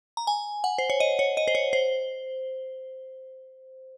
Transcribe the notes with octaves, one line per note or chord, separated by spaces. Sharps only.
A#5
G#5
F#5
C5
C#5
D#5
C#5
D#5
C5
C#5
C5